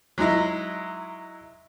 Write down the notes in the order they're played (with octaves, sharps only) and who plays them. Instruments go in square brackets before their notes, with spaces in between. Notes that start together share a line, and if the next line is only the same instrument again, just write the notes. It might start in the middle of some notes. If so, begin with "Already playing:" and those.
[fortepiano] F#3 G#3 D#4 E4